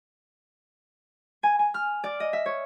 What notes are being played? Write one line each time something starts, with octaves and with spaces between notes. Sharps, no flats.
G#5
G#5
F6
D5
D#5
E5
C#5